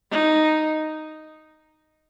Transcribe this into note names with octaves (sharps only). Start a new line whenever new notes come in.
D#4